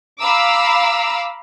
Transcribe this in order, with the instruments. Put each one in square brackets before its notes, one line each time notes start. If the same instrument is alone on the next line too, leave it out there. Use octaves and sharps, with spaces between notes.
[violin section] F5 A#5 B5 D6 E6